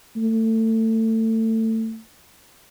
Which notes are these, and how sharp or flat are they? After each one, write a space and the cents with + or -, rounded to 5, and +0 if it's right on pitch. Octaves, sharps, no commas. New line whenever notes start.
A3 +25